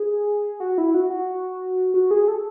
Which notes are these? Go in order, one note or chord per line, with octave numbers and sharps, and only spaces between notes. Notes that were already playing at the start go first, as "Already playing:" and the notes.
Already playing: G#4
F#4
E4
F#4
F#4
F#4
G#4
A4